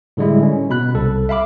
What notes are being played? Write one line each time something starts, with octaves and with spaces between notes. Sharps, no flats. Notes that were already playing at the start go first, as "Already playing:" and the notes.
A2 D3 G3 G#3 E4
C#4
B2 B5 F#6
C2 A4
E5 F5 B5 D6